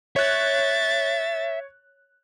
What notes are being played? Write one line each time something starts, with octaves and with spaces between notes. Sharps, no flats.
C#5 E5 F#6 A6